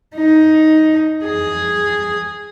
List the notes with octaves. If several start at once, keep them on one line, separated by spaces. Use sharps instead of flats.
D#4
G#4